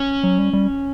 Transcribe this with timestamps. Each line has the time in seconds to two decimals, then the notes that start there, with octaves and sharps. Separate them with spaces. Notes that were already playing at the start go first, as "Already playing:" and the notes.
Already playing: C#4
0.24 F#3
0.38 G3
0.53 G3